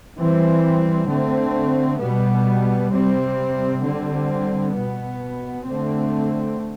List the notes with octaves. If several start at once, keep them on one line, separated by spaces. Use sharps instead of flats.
E3 G3 C4
D3 A3 C4
B2 G3 B3
C3 G3 C4
D3 G3 C4
B2 B3
D3 A3 C4